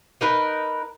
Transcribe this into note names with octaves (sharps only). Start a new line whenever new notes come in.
D#4 A#4 B4